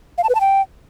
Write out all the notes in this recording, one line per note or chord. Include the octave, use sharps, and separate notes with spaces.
F5
A5
B4
A5
G5